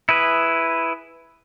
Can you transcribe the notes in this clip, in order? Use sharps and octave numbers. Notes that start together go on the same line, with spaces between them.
E4 G#4 B4